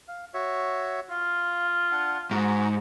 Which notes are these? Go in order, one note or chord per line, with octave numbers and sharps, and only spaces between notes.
F5
F#4 C#5 E5
F4 F5
D4 F#5
G#2 F#4 A#5